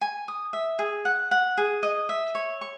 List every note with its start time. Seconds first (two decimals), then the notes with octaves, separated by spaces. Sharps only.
0.01 G#5
0.28 D#6
0.53 E5
0.79 G#4
1.05 F#5
1.31 F#5
1.57 G#4
1.83 D#5
2.09 E5
2.35 C#5
2.61 C#6